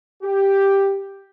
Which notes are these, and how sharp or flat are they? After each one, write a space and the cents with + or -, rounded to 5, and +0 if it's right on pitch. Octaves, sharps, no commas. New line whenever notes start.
G4 +5